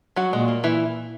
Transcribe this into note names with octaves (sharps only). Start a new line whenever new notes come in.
F#3 F#4
A#2 G#3
A#3
E3 E4